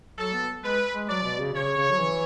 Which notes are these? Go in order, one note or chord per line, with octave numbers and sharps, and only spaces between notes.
F#3 A4
B3
G#3 B4
G#3
F#3 D5
B2
C#3
C#3 C#5
C#3
F#3
E3